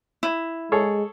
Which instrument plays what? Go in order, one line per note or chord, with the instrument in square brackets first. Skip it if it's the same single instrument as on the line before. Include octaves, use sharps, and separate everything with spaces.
[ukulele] E4
[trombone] G#3 [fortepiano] G#4 A4 C#5